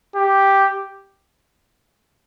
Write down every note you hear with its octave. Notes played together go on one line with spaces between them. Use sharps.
G4